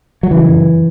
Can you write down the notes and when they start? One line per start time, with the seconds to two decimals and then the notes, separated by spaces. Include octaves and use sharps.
0.23 F#3
0.31 C#3 E3
0.48 F#2